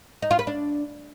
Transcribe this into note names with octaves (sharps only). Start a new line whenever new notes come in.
D#4
F4
B4
D4